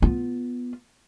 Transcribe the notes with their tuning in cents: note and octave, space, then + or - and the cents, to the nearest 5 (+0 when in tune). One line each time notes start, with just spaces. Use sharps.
B3 +0 F4 +0